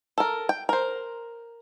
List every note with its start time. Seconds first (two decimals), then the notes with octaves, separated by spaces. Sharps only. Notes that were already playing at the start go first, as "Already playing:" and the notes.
0.18 A4 A#4
0.49 G5
0.69 A#4 C5